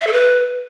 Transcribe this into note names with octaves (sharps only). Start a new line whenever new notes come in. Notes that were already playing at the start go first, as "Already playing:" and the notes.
E5
A4
B4